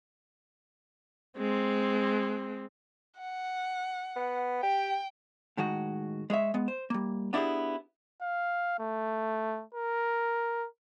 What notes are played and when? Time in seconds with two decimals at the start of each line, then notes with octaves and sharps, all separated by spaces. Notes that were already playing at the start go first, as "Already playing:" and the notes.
1.38 G#3 C4
3.19 F#5
4.16 B3
4.63 G4 G5
5.57 A2 D#3 G#3 F#4
6.30 G#3 G#4 C#5 E5
6.54 G#3 B3
6.68 C5
6.90 G3 A#3
7.33 B3 D4 E4 F4 G4 G#4
8.22 F5
8.80 A3
9.74 A#4